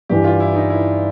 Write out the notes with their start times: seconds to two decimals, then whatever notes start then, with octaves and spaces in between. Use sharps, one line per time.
0.09 G2 E3 G3 G4
0.24 F4
0.40 E4
0.55 D#4
0.70 E4